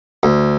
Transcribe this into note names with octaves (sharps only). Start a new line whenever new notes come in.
D2